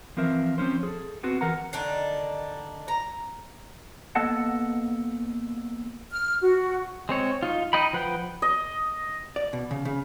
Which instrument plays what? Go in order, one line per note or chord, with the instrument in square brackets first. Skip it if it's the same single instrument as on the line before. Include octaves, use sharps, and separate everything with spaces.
[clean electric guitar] E3 F3 C4 A#4 E5
F3 C4 C#4 C5
G#4 A4
B3 C4 F#4
E3 A#4 F#5 A#5
[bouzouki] D3 D#3 D4 D#4
A#5
[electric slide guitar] A#3 B3 A4 D#5 F#5 A5
[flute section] F6
F#4
[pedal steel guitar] G#3 C4 C#5
D#4 F4
D#4 D#5 G5 B5
F3 B4 F#5 G5
[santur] D#5
[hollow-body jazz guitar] D5
B2
C#3
C#3